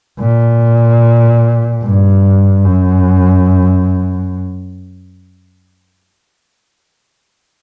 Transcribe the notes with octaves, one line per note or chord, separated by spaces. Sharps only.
A#2
G2
F#2